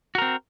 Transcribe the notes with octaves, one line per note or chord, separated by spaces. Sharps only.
C4 F#4 A#4